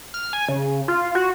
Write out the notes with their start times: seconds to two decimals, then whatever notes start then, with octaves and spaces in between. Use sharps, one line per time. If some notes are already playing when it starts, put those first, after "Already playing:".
0.14 F6
0.33 G#5
0.48 C#3
0.88 F4
1.15 F#4